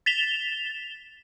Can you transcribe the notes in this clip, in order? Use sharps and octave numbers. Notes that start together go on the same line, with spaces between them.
A6 B6 E7 F7 G7